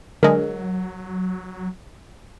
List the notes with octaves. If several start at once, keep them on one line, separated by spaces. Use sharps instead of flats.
D3 F#3 G#3 A#4 D#5